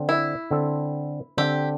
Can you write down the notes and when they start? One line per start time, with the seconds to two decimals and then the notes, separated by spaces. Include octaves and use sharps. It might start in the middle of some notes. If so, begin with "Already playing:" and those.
Already playing: D3 C4 A4
0.09 E4
0.51 D3 C4 A4
1.37 D3 C4 G4 A4